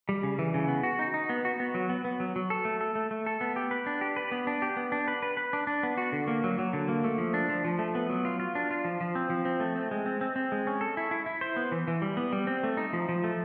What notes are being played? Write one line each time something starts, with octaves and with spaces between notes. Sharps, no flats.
G3
C#3
E3
C#3
B3
F#4
D#4
D#4
B3
F#4
B3
F#3
B3
B3
F#3
F#3
A4
A3
A4
A3
A3
A4
B3
G4
B4
D4
G4
B4
B3
D4
G4
B3
D4
B4
B4
B4
D4
D4
B3
F#4
D3
A#3
F#3
F#3
D3
A#3
A3
F3
D4
F3
F3
A3
B3
F#3
F4
F4
D4
F4
F3
F3
C4
F3
C4
A3
C4
G#3
C4
C4
C4
G#3
C#4
A4
E4
E4
E4
C5
B3
E3
E3
G3
B3
G3
C4
A3
D#4
F3
F3
A3